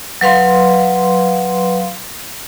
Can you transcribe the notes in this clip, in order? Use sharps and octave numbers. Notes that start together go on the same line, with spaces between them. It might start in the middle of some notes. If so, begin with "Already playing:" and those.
F#3 B4 F5 C6